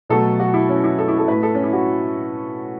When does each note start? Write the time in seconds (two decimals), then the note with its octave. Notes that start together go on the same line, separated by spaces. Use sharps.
0.10 B2 F#3 A3 A4
0.40 F#4
0.54 E4
0.69 C#4
0.84 E4
0.98 A4
1.08 E4
1.18 A4
1.28 A2 A3 B4
1.43 A4
1.55 C#4
1.64 E4
1.73 F#4